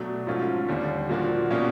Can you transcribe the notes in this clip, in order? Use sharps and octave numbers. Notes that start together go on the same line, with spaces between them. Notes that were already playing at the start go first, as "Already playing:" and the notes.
Already playing: B2 F#3 A3 D4
G#2 F3 A3 C#4 F4
D#2 D3 G3
A#2 F3 A#3 D4 F#4
B2 G3 A#3 C#4 F4